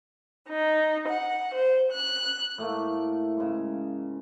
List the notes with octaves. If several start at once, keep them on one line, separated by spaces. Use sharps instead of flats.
D#4
F#5
C5
F#6
A2 A3 A#3
G#2 C#3